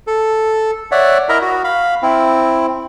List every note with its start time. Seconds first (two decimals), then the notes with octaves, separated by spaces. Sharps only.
0.07 A4
0.92 C#5 D5 E5 F#5
1.29 E4 A#4 D#5 E5 A#5
1.42 F#4
1.64 F5 B5
2.02 C4 E4